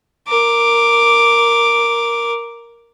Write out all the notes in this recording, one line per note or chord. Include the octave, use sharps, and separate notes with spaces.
A#4 D6